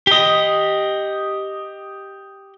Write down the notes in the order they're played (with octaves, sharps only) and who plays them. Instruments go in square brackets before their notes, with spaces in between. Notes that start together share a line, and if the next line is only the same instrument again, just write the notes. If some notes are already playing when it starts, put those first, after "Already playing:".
[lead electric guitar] G4 D#5